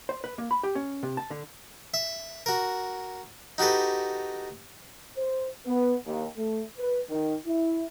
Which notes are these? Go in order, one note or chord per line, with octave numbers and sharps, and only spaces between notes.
C5
B4
A#3
B5
G4
C#4
C3
A5
D3
E5
F#4 A#4
D#4 F#4 G4 A4 B4
C5
B3
D#2
A3
B4
D#3
E4